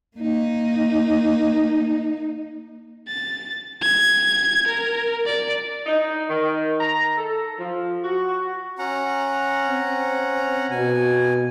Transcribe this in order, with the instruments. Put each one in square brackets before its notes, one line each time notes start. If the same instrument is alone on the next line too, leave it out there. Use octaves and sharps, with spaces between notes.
[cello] A#3 D#4
[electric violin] A6
G#6
A#4
D5
[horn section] D#4
D#3
A#5
A4
F3
F#4
[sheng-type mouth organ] C#4 F#5 A#5
[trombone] C4
[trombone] B2 [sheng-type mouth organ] G#5